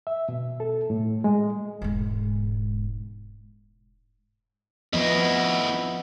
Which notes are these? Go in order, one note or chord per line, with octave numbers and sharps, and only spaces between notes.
E5
B2
A4
A2
G#3
E1 G#2
F2 F3 B3 E4 D#5